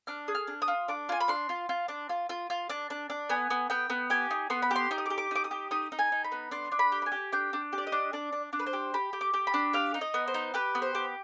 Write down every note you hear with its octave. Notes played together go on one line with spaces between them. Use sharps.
D4 F6
G#4
F6
D4
D#6
F4
D4 D6
F4 G#5
B5
D4 C6
F4
F4
D4
F4
F4
F4
D4
D4
D4
B3 G#5
B3
B3 G5
B3
G4 G#5
D#4
B3 C6
B5
G4 C6
D#4 D6
D#6
D6
G4
D6
D#4 D6
D#6
G4
D#4 D#6
D#4
G#5
D#4
B5
B3
D4 C6
D4
B5
G4
B5
G#5
G4
D4 G5
D4
G4
D5
D#5
D4
D4 D5
D4
D4
B4
C5
G4
G4 B5
G4
D6
G4
B5
D4
G4 F5
D#4
D#5
B3
C5
D#4
G4 B4
B3
C5
G4